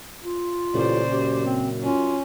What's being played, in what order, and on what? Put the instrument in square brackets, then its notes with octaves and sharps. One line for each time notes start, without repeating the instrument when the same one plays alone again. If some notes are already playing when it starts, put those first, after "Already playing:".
[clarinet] F4
[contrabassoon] A1 [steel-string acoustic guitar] A#2 C#3 [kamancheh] C5 D5
[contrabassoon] F#2 [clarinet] G4
[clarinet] C4
[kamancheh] C#4 [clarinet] F4